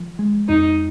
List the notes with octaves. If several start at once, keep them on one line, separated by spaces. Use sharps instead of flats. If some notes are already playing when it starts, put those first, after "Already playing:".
Already playing: F3
G#3
F2 D#4